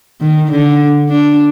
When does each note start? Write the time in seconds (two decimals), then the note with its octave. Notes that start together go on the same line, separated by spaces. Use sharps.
0.21 D#3
0.51 D3
1.10 D4